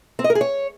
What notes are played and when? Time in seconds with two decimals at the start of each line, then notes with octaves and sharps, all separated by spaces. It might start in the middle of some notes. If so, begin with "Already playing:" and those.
0.19 C4
0.24 D#5
0.30 A#4
0.35 G#4
0.41 C#5